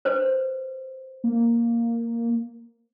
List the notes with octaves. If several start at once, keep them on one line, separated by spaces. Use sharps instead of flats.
B4 C5
A#3